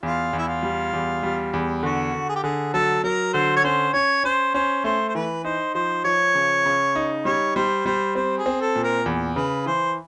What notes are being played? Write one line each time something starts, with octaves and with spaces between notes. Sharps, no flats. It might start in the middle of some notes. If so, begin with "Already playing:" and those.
E2 F4
E2
E4
F4
G3
E2
G3
E2
D3 F#4
D3
G#4
G4
D3 G#4
F#3 A4
F#3 A#4
D3 C5
C#5
C#4 C5
C#4 C#5
C#4 C5
C#4 C5
A3 C5
C5
E3 B4
D#4 C5
F3 C5
F3 C#5
C#3
C#3
D#4
G3 C#5
G3 C5
G3 C5
C4 C5
G#4
C4
A4
A#2
A#4
E2
C#3 B4
E3 C5